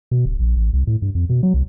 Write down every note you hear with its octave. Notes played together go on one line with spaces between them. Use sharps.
B2
D1
A#1
A1
C2
A2
G2
F2
B2
F#3
C2